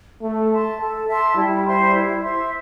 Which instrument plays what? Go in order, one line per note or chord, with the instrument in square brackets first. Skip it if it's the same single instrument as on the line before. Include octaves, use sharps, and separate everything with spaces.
[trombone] A3 [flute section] A4
[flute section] E5 A5 C6
A4
E5 A5 C6
[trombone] G3 [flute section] E4
[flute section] C5 E5 C6
E4
C5 E5 C6